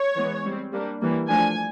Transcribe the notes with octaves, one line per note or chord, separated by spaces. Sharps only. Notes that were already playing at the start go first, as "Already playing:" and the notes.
Already playing: C#5
E3 G#3 B3
G3 C4
G3 A#3 D4
E3 G3 A#3
F3 A3 D4 G#5